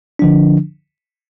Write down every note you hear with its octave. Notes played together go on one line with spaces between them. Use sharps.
D3 F3 D4